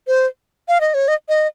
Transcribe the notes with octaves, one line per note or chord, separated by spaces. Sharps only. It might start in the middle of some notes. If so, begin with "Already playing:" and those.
C5
F5
D#5
C#5
D#5
D#5